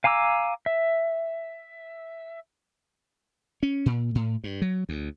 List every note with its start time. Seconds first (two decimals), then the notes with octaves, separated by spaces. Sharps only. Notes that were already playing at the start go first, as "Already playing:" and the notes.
0.04 F5 G#5 A#5 D6 E6
0.66 E5
3.63 C#4
3.86 A#2
4.15 A2
4.44 G2
4.62 F#3
4.89 D2